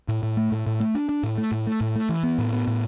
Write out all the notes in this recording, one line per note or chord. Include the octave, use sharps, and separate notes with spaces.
A2
A2
A3
A2
A2
A3
D4
D4
A2
A3
A2
A3
A2
A3
E3
B3
A2
B3
A2